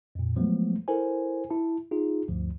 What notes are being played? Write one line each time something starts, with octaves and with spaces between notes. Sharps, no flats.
F2 A#2
F3 F#3 G#3 A3 B3
E4 A4 A#4 C5 G#5
E4 A5
D#4 F4 G#4
D2 G2 F3